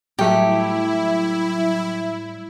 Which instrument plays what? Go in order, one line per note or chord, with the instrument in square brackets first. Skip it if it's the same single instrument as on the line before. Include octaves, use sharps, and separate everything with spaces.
[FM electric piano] A2 F#3 G3 [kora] A3 D#4 [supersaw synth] E4 [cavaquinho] G4